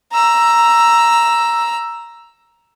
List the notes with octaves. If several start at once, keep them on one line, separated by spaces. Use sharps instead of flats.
A#5 E6